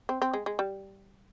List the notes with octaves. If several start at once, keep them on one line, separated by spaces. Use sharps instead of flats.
C4
C4
G#3
G#3
G3